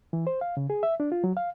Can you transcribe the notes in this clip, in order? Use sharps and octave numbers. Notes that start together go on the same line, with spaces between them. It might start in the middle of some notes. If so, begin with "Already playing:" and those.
E3
C5
F5
C#3
G#4
E5
D4
F4
F#3
F5